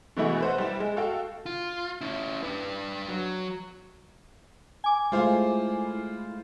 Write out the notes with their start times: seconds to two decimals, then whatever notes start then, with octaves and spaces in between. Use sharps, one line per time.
0.17 B2 E3 G#3 A3 E4 F#4
0.41 B4 C5 F#5
0.58 G3 E4 E7
0.80 G#3
0.97 F#4 A4 F5 G5
1.46 F4
2.01 C#4 E4
2.43 D4 B4
3.08 F#3
4.84 G#5 D6
5.12 G#3 A3 E4 F4 C5 F5